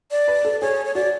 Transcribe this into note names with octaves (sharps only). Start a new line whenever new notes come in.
D5
B4
A4
G#4 C#5
C#5
F#4 D5